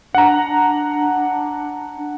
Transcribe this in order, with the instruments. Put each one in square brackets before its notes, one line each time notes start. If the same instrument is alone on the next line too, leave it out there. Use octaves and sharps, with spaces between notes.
[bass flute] D4 [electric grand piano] F#5 A#5